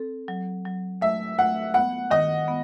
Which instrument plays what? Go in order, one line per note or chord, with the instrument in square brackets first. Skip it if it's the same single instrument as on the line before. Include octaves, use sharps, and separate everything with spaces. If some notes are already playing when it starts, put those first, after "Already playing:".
Already playing: [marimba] C4 A4
F#3
F#3
[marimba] A3 [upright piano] E5
[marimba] A3 [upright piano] F#5
[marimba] B3 [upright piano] F#5
[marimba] D#3 [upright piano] D#5
[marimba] B3